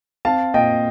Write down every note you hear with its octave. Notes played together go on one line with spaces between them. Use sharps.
C4 F5 A5
A#2 D#5 G5